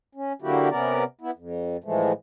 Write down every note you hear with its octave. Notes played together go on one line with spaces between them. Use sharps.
C#4
D3 F#3 A#3 E4 F#4 G4
C3 B3 C#4 A#4 D5
B3 E4
F2
A2 E3 F3 G#3 A3